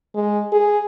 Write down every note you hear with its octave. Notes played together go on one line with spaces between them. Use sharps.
G#3
G#4